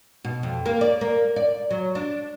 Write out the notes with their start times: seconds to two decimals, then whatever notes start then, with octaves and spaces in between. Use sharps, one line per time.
0.24 B2
0.43 F2
0.66 A#3
0.81 D5
1.01 A#3
1.36 D5
1.71 F#3
1.95 D4